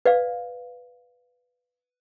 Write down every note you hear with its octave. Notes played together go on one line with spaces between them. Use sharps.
B4 D5 F5